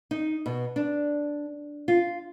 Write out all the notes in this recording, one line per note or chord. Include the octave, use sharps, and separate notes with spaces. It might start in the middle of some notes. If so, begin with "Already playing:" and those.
D#4
B2
D4
F4